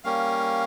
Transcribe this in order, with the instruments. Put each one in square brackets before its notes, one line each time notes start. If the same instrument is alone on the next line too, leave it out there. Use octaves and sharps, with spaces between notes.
[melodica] G3 A#3 C#4 F5